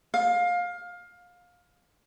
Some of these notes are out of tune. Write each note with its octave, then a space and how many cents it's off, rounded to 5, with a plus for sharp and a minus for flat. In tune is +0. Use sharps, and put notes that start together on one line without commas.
F5 +20